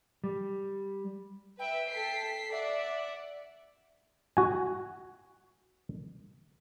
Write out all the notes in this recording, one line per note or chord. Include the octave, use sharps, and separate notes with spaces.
G3
B4 E5 G5
A4 B6 C7
D5 E5 F#5
F#4 G#5